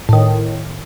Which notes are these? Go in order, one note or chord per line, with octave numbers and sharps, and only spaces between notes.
A2 D#3